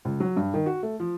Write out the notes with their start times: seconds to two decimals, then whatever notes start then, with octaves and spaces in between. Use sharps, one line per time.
0.05 C#2
0.20 F#3
0.37 G2
0.54 D#3
0.66 F#4
0.83 A3
1.00 F3